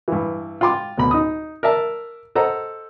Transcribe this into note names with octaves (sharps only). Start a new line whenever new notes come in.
G2 E3
F4 G5 C6 D6
D2 B2 B5
D#4 D#6
A#4 D5 E5 A5
A4 C5 D#5 F#5 A#5